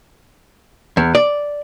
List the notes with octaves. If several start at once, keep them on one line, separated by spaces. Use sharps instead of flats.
E2
D5